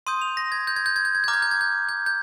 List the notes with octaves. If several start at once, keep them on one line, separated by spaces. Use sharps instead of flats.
C6 D#6 G6 D#7
F7
A#6
G#6
G6
G#6
G6
G#6
G6
G#6
A#5 D6 F6 G6
G#6
G6
G#6
G6
G6
G6